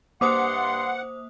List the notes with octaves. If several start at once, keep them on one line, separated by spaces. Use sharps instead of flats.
G2 A#3 C5 F#5 C6 D6 D#6